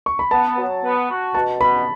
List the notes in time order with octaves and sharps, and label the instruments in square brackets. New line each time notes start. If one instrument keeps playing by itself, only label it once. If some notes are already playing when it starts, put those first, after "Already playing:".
[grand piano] C#6
B5
[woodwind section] B3 [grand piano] A5
[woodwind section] F#3
B3
F#4
[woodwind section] B2 [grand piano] A5
[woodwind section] B2 [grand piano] B5